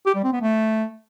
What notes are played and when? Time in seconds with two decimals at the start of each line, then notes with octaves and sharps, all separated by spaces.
0.06 G4
0.15 G3
0.24 C4
0.33 B3
0.42 A3